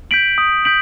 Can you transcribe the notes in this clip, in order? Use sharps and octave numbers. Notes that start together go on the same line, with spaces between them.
G6 B6 D7 F#7
D#6
G6 B6 D7 F#7